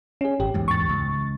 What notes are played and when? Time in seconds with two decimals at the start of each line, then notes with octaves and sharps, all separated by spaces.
0.21 C#4 G#4
0.40 G#1 G4
0.54 D1 E2 G#2
0.68 C#6 A6
0.89 C#2